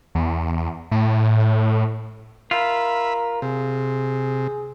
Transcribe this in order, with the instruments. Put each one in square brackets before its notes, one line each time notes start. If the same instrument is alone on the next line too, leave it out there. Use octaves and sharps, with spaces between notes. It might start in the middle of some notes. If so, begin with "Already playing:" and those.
[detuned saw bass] E2
A2
[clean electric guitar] F4 [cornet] A#4 [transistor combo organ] E5 B5
[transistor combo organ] C3 [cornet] G#4